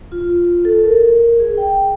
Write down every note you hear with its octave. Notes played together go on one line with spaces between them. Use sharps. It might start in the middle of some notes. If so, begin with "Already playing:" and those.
F4
A4
A#4
G#4
G5